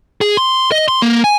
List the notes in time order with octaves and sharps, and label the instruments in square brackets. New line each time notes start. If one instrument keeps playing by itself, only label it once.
[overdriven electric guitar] G#4
C6
D#5
C6
A#3
G#5